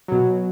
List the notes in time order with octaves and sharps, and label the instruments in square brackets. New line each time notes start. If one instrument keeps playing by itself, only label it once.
[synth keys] B2 F#3